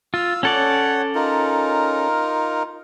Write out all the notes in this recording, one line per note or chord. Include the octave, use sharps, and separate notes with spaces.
F4 F5 E6
C#4 A4 C#5 D5 F#5
D#4 F4 A#4